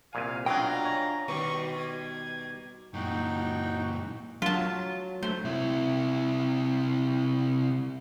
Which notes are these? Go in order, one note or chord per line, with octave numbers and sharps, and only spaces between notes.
C2 A#2 F5 G#5
B2 F#3 D4 F4 D#5 G5 A#5
C#5 G#5
B2 D#3 G3 C#6
G#6
F#2 A#2 D#4 F#4 G5
F#3 F4 A5
A3 C5
C3 E4